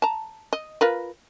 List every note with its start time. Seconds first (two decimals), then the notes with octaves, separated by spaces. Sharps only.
0.02 A5 A#5
0.53 D#5
0.81 F4 A#4 B4